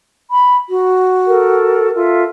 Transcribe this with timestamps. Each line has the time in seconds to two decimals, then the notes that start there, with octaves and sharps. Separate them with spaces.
0.31 B5
0.69 F#4
1.27 A4 A#4
1.95 F4 A4 E5